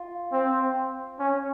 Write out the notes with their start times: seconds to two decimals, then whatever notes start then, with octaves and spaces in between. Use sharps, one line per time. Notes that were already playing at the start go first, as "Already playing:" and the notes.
Already playing: F4
0.33 C4
1.19 C#4